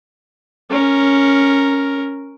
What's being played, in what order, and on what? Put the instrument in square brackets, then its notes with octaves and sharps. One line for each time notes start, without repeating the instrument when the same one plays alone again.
[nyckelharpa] C#4 A#4